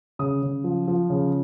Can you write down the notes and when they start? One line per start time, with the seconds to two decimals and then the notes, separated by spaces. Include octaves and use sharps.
0.19 C#3 D#6
0.43 C#3
0.64 F3
0.88 F3
1.10 C#3